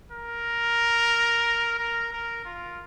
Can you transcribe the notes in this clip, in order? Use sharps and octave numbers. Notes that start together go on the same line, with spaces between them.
A#4
A#4
A#4
F4